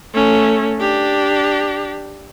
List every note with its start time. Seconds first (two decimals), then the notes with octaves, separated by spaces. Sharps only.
0.14 A3 C#4
0.79 D4 G4